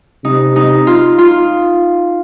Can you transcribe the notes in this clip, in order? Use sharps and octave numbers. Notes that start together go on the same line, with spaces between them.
C3 D#4
D#4
F4
F4